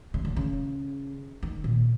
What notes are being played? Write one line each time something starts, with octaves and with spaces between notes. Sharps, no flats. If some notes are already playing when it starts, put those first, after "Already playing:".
C#3
D3
C#3
D#3
A#2